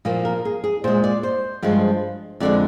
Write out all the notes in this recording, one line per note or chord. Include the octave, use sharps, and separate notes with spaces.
A#2 F3 A#3
A#4
G#4
G#4
A#2 G#3 C5
D5
C5
G2 F3 G#3
F2 D3 G#3 D5